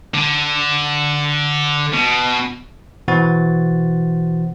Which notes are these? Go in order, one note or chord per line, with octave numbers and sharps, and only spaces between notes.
D3
B2
B2 E3 F#4 C5 F#5 A6